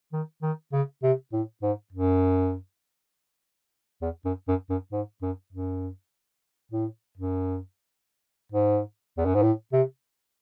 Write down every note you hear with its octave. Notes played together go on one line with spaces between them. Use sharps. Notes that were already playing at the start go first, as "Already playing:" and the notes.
D#3
D#3
C#3
C3
A2
G#2
F#2
E2
F#2
F#2
F#2
G#2
F#2
F#2
A2
F#2
G#2
E2
F#2
G#2
A2
C3